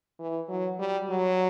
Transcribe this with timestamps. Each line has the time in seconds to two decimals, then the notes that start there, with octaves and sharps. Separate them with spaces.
0.19 E3
0.49 F#3
0.79 G3
1.09 F#3